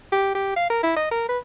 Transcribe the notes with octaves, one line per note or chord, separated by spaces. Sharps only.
G4
G4
F5
A#4
E4
D#5
A#4
B4